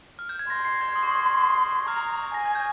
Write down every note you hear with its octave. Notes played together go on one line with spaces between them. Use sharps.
F6
G6
G#6
C6 A#6
C7
G#6
D#6
C#6
D#6
A#5 F6
G#5 A#6
G#6
G6